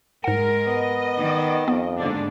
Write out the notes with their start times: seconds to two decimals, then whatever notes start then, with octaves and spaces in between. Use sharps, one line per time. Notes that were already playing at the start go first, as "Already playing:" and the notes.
0.24 G#2 G#3 A#4 F#5
0.68 B3 D#5
1.17 D#3
1.68 F2 B3
1.98 D#2 G#2 D3 D4